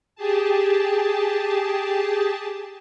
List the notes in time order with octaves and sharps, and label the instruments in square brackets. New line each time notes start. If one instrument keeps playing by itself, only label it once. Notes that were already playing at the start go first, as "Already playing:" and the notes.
[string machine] G4 G#4 A5